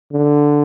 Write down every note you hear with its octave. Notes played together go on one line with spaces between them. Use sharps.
D3